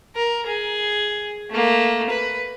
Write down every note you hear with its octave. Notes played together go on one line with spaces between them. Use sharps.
A#4
G#4
A3 A#3
B4